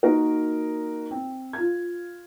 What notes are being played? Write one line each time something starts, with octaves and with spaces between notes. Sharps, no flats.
A#3 D#4 F#4 A#4
C4
F4 G#6